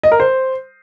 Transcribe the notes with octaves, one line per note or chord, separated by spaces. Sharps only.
D#5
A#4
C5